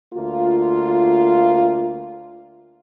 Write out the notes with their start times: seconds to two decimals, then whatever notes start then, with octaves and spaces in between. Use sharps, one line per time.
0.14 D2 A#3 F4